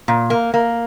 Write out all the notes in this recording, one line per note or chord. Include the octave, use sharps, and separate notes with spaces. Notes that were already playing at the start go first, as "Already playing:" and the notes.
A#2
A#3
A#3